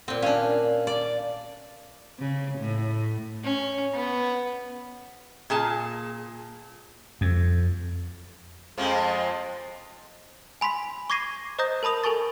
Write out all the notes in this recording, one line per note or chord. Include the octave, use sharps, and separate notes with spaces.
A#2 C4
C#4 D4 F5
D5
C#3
A2
C#4
B3
A#2 G#4 A5
F2
F2 F3 G#3
G#5 B5 C6 B6
C#6 D6 G#6 A#6 C7 D#7
C5 D#5 A#5 D#6 G6 A#6
A#4 A5 B5 D#6 F7
A4 A#4 G#5 A5 C#6 A6